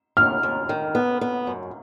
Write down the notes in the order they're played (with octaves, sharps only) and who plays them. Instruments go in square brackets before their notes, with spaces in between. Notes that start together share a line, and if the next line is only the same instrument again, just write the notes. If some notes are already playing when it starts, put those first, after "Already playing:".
[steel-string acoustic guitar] D#2 [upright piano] F6
[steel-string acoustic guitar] D#2
D#3
B3
B3
F#2